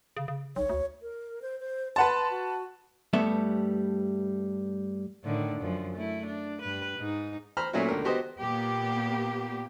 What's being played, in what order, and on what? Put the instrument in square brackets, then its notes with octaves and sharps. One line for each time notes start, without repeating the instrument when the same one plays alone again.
[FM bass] C#3
C#3
[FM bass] B1 [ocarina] C#5
[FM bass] D2
[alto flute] A#4
C5
C5
[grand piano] B4 F#5 A5 [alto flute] C6
[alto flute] F#4
[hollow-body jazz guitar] G2 G3 A3 B3 A4 E5
[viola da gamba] A2 D3 D#3
F#2 F3
A3 E4
D4
G2 B4
G#2 D#4
[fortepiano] C5 A#5 B5 F6
A#2 F#3 A3 C#4 E4 F#4
C#2 D3 A#4
B3 F#4 G4 C5 D#5
[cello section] A#2 A#3 B3 G4